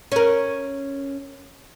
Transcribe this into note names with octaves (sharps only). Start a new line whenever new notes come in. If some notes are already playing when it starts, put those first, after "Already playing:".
C#4 A#4